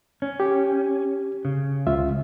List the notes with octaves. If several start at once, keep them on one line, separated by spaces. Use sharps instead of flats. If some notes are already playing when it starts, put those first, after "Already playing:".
C#4
G4
C#3
C#2 F4 E5